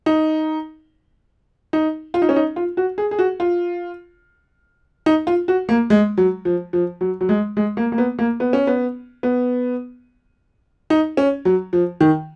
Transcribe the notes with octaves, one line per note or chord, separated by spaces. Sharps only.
D#4
D#4
F4
D#4
C#4
D#4
F4
F#4
G#4
G#4
F#4
F4
D#4
F4
F#4
A#3
G#3
F#3
F3
F3
F#3
F#3
G#3
G#3
A#3
A#3
B3
A#3
B3
C#4
B3
B3
D#4
C#4
F#3
F3
D#3